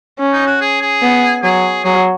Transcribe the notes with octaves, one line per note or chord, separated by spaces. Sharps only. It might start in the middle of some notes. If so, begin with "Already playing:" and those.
C#4
D#4
F#4
G#4
G#4
B3
F#3 G#4
F#3 G#4